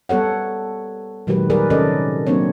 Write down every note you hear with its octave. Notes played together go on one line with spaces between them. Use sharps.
G3 B3 A4 C#5 F#5
A#2 D#3 F#3 G#3 G4 B4
G3 G#4 A#4 B4 D5
C3 D#3 C#4 A4 D5 D#5
F#3 A#3 C4 D4 C#5